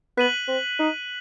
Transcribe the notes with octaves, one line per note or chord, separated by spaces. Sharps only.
B3 F#6 B6 D#7 F#7
C4
D#4